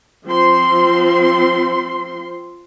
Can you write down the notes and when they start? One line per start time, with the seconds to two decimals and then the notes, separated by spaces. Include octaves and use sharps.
0.26 F3 C4 C6